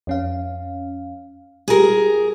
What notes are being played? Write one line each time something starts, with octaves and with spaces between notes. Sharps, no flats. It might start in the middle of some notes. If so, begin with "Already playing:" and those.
F2 C#4 F5
G3 F4 G4 G#4 A#4